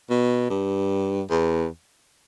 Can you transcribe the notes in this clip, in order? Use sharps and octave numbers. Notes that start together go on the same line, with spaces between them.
B2
G2
E2